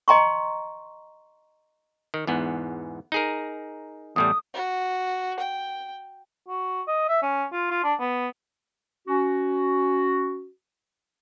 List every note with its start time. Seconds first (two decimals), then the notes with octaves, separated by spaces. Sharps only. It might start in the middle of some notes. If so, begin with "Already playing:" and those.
0.08 D#5 G5 A#5 C6 C#6
2.14 D#3
2.27 E2 G#2 B3
3.12 D#4 G#4 A#4
4.16 E2 A2 G3 D#6
4.54 F#4
5.40 G5
6.48 F#4
6.88 D#5
7.09 E5
7.23 C#4
7.52 F4
7.71 F4
7.84 D4
8.00 B3
9.08 C#4 F#4